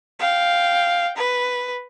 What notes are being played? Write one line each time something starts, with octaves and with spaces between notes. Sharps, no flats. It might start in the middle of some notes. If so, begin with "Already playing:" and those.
F5 G5
B4